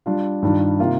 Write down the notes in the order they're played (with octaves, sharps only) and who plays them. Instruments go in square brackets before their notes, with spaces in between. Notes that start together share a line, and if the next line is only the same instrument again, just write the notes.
[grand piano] G3 D4 F4
G2 D#3 G3 D4 F4
C3 D#3 A#3 F4